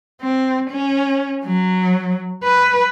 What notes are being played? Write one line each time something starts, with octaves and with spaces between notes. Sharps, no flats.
C4
C#4
F#3
B4